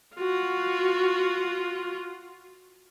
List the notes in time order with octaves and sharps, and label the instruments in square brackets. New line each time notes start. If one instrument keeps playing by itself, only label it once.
[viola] F4 F#4